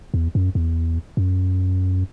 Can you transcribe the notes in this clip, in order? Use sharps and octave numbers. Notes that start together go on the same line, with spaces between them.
E2
F#2
E2
F#2